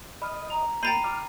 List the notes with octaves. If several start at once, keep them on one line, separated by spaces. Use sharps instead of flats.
D#5 B5 F6
A#5 F7
A#3 G5 A#5 B5 G6 A6 C7 D#7
D6 F6